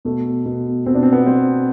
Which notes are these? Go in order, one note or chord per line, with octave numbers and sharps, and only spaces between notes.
B2 A3
B2
B2 C4
D4
C4
B3
C4